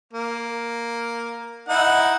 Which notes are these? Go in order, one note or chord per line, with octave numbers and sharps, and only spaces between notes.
A#3
D#4 E4 F#5